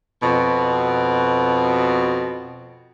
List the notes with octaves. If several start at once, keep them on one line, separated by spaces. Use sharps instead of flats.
F2 B2